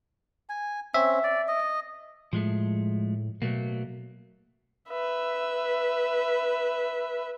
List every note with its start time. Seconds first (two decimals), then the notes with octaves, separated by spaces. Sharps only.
0.49 G#5
0.94 C4 C#4 E5
1.24 D5
1.48 D#5
2.33 A2 F3 G#3 A3
3.42 B2 F#3 A3 A#3
4.89 B4 E5